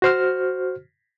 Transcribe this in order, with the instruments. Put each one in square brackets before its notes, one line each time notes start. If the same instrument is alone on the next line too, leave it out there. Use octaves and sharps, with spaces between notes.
[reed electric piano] F#4 C5 F6